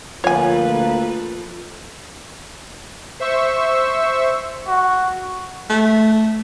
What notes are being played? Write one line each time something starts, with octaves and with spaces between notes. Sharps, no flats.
D2 F3 A#3 A4 B4 C#5 G#5
C5 E5 C#6 E6
F#4
A3